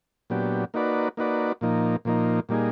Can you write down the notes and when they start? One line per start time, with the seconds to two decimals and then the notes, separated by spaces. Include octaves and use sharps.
0.30 A#2 F#3 B3 D4 G4
0.74 A#3 D#4 F#4 B4 D5
1.17 A#3 D#4 F#4 B4 D5
1.61 A#2 F3 A#3 D#4
2.05 A#2 F3 A#3 D#4
2.49 A#2 G3 A#3 D#4 G#4